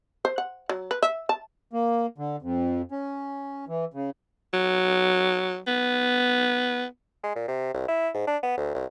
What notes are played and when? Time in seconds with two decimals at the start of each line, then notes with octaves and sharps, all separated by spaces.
0.25 C5
0.38 F#5
0.69 F#3
0.91 B4
1.03 E5
1.29 A5
1.73 A#3
2.18 D3
2.42 F2
2.91 C#4
3.68 E3
3.94 C#3
4.53 F#3
5.67 B3
7.23 G#3
7.36 A#2
7.48 C3
7.74 C2
7.88 E4
8.14 G#2
8.27 D4
8.43 B3
8.57 D2
8.75 C2